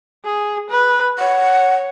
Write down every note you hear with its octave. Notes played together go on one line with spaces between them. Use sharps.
G#4
B4
C#5 F#5